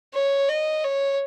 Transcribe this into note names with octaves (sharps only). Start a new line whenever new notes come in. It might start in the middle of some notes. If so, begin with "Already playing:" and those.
C#5
D#5
C#5